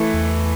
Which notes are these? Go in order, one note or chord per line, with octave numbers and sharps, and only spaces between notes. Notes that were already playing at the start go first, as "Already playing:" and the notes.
Already playing: E3 A3
E2